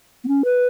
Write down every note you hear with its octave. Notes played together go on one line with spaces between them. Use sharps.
B3
C#4
B4